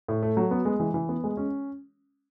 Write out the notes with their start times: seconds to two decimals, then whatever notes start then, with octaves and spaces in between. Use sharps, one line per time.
0.08 A2
0.22 A3
0.37 F#3
0.51 B3
0.65 G#3
0.80 E3
0.94 E3
1.09 B3
1.24 G#3
1.37 C#4